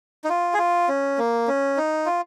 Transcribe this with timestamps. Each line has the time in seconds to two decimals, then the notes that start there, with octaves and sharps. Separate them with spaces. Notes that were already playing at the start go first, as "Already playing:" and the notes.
0.24 D#4
0.30 F4
0.54 G#4
0.58 F4
0.89 C#4
1.18 A#3
1.48 C#4
1.77 D#4
2.06 F4